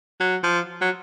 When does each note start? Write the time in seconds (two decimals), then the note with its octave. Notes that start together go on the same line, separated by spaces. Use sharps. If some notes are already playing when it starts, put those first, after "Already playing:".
0.20 F#3
0.44 F3
0.81 F#3